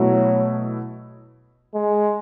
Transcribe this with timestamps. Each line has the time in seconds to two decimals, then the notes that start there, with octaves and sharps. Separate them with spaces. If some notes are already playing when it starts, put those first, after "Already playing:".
Already playing: B2 F#3 A3 E4
1.74 G#3